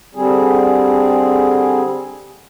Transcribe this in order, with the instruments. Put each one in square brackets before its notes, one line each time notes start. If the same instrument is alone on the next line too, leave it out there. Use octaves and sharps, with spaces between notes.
[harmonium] D3 G3 C4 G#4